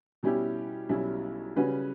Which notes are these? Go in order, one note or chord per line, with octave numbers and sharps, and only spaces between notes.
B2 G3 C#4 E4 G4
B1 B2 G3 C#4 E4
C#3 G3 C#4 F#4 B4